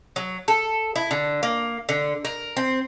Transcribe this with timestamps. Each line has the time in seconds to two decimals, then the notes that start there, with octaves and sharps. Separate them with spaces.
0.16 F#3
0.48 A4
0.96 E4
1.11 D3
1.43 A#3
1.89 D3
2.25 A#4
2.57 C4